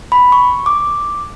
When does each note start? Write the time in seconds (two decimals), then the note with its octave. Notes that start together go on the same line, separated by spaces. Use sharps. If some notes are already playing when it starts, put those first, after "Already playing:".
0.12 B5
0.32 C#6
0.66 D6